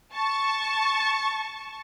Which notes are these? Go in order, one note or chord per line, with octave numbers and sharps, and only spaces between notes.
A5 C#6